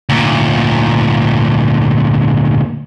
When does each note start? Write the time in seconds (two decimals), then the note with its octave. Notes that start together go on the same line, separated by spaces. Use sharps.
0.09 D2 A#2